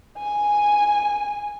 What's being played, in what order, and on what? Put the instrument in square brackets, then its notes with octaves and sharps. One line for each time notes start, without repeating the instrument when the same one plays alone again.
[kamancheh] G#5